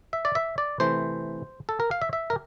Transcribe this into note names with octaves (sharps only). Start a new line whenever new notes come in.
E5
D5
E5
D5
C3 E3 A3 C5
A4
A#4
F5
E5
E5
A#4